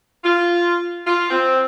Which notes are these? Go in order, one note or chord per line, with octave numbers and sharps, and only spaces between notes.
F4
F4
C4